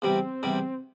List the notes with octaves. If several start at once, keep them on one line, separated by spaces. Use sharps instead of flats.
E2 C3 G3 C4
E2 C3 G3